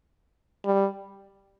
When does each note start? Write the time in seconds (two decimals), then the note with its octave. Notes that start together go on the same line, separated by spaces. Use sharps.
0.65 G3